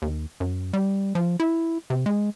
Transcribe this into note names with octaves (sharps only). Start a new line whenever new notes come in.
D#2
F#2
G3
F3
E4
C3
G#3